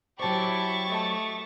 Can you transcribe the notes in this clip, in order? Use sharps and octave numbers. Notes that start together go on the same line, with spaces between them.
F#3 E4 G4 C5 D5 A5 C#6 A6
A3 D#5 A5